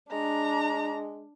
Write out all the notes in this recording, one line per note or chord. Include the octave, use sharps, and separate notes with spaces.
G#3 D4 A#5